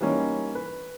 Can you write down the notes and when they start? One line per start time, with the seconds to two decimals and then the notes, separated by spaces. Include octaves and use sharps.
0.01 E3 G3 A#3 C#4 D#4
0.55 B4